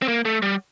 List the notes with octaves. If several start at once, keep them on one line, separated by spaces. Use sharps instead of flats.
C4
A#3
A3
G3